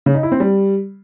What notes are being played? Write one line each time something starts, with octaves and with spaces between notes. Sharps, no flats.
C#3
D#4
E4
C4
G3